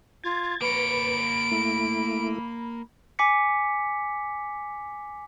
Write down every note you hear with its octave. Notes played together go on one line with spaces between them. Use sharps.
F4 G#6 A6
A#3 B4 C#5 B5 D7
A3 E4
G#5 D6 B6 C#7